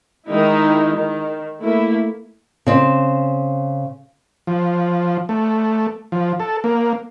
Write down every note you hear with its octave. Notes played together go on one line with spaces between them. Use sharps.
D#3 G#3 D#4 E4
D#3
A3 A#3 E4
C#3 C4
F3
A3
F3
A4
A#3